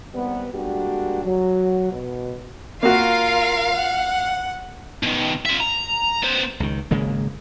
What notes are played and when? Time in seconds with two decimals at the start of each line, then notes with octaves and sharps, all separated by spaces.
0.14 D#2 C3 G3 B3
0.53 G3 G#3 A#3 D4 F#4 G4
1.24 F#3
1.92 B2
2.83 A#3 F4 F#4 A#4 F5
3.73 F#5
5.03 B2 D#3
5.45 F4 E5
5.60 A#5
6.23 B3 C5
6.60 C#2 D#3
6.91 G#1 C#3 G#3 A#3